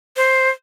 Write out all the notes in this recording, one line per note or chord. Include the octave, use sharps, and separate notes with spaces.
C5